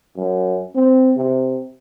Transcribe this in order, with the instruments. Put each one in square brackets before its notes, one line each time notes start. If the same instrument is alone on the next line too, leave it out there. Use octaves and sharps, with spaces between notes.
[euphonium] F#2
C4
C3